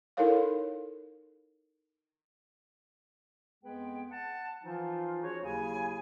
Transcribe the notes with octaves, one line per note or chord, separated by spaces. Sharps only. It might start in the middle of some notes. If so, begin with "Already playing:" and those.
D#4 E4 A4 A#4 C#5 F5
F2 G#3 B3 G#4 B4 G5
F#5 A5
E3 F3 D#4 F4
C#4 F#4 G#4 C5 C#5
D#2 C#3 F#3 E4 G#4 G#5